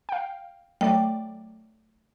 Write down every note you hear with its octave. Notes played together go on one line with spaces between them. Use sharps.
F5 G5
F#3 A3 D5 G5